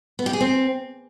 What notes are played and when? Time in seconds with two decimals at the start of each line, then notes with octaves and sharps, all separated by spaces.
0.19 B3
0.26 G4
0.33 G#4
0.41 C4